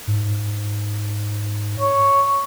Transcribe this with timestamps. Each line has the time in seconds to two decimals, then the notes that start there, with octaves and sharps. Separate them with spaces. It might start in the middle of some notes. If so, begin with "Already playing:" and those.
0.07 G#2
1.80 C#5